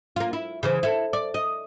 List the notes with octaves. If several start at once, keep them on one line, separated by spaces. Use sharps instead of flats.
A#3 F4
E4
C#3 E3 C5
E4 A4
D5
D#5